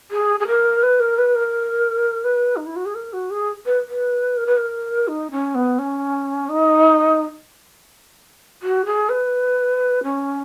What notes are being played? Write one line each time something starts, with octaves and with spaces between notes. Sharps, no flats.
G#4
G#4
A#4
B4
A#4
B4
A#4
B4
D#4
E4
F#4
G#4
A#4
F#4
G#4
B4
B4
A#4
B4
A#4
D#4
C#4
B3
C#4
D#4
F#4
G#4
B4
C#4